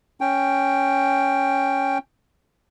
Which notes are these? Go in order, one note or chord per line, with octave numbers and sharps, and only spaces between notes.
C#4 G5